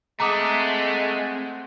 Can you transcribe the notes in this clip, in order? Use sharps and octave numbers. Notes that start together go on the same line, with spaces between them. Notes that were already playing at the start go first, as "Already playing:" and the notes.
G#3 A3 C4 F#5 A#5 D6 D#6